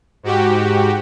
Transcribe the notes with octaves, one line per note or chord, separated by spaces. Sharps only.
G#2 F#4 G4